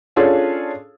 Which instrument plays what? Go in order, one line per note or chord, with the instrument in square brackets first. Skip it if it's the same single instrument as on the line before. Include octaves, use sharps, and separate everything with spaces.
[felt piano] C#4 D4 F4 G#4 A4